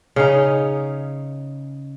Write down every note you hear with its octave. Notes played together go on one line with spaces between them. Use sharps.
C#3 C#4 D#4